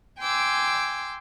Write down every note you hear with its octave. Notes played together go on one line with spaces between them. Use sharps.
G5 G#5 C6 D6 E6